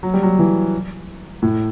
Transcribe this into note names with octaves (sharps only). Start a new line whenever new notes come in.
F#3
G3
F#3
E3
A2